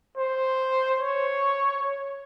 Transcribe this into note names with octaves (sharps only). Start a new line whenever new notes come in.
C5
C#5